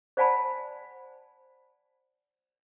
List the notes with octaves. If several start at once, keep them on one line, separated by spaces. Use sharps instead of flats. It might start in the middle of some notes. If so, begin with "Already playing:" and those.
C5 D5 F#5 G#5 A5 B5